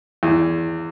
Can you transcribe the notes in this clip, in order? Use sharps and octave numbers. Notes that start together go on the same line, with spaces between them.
E2